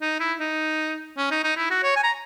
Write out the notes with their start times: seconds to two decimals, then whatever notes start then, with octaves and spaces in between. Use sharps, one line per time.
0.01 D#4
0.20 E4
0.39 D#4
1.17 C#4
1.31 D#4
1.44 D#4
1.56 E4
1.70 F#4
1.83 C#5
1.96 G#5
2.03 A#5